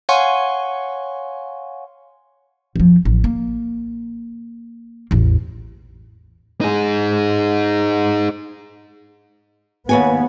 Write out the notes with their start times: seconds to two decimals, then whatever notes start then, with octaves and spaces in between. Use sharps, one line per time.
0.09 C#5 F5 F#5 G#5 C6 C#6
2.76 F#2 F3
3.05 A1
3.24 A#3
5.11 A1 E2
6.61 D#4 G#4
9.89 D#2 B3 C#5 G#5